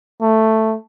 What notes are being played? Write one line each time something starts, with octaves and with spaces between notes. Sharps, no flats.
A3